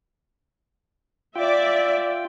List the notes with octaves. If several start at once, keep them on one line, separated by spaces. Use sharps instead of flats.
F4 D5 E5 G5